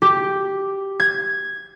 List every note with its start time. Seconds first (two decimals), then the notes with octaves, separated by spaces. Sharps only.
0.02 G4
1.00 G#6